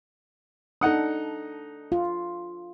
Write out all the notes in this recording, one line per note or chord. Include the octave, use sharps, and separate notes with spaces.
D4 D#4 A4 F#5 D#6
F4